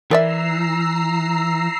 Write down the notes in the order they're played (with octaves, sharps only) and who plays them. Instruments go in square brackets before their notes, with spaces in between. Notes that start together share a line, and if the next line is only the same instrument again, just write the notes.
[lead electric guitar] E3 [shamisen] A#4 D5 E5 [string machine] A#5 E6 C7